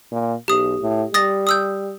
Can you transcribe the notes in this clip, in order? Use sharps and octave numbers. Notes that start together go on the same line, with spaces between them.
A#2
B1 G4 D#6
A2
G3 D#6 A6 A#6
D#6 E6 G6